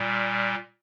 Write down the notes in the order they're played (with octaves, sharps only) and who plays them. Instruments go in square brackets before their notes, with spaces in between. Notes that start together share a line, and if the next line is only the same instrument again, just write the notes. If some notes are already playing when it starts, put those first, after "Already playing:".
Already playing: [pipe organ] A#2 G3